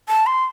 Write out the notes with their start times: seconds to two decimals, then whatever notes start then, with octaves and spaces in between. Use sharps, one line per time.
0.09 A5
0.26 C6